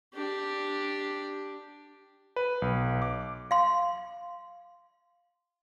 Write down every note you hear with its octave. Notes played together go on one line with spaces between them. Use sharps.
D4 G4
B4
B1
D6
F5 C6